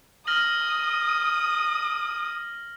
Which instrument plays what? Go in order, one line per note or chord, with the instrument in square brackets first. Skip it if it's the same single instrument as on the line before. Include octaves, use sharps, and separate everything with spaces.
[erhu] D#6 [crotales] F6 A#6 F#7